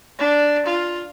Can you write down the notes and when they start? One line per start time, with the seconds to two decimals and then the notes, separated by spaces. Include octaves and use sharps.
0.19 D4
0.66 F4